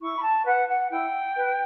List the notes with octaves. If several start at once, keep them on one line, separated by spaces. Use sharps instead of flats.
E4 C#6
B5
A5
B4 F#5
F#5
E4 G5
B4